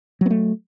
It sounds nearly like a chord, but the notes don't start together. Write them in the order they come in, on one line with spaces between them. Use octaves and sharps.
F#3 B3 A3